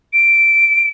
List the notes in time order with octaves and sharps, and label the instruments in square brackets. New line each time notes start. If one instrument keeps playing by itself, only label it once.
[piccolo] D7